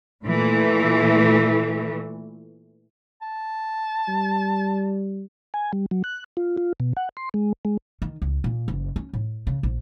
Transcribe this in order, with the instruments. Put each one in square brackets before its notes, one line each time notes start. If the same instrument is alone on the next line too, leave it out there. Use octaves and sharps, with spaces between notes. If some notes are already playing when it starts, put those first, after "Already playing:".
[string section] A#2 E3 A3
[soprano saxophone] A5
[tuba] G3
[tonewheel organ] G#5
G3
F#3
F#6
F4
F4
B2
F#5
C6
G#3
G#3
[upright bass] D#3
C#2
A#2
F#1
C#4
A2
C#3
A#1